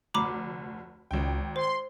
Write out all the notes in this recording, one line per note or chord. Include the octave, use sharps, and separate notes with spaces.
F1 D2 A#5 B5 D6
G#1 C#2 G5
C5 C6